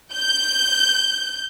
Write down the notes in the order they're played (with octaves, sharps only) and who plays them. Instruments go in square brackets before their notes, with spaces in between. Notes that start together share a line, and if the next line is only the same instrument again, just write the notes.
[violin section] G6